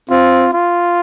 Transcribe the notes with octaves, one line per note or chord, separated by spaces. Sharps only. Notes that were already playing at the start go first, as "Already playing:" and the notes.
C4 F4
F4